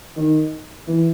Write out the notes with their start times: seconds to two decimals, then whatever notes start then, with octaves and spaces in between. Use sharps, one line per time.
0.16 D#3
0.87 E3